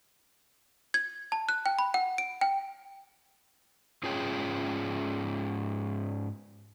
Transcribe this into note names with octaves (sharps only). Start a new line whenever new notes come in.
G#6
A5
F#6
G5
B5
F#5
D7
G5
G#2 C#4 F4 G#4 C#5 G5